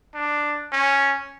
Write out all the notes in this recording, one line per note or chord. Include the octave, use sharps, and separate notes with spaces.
D4
C#4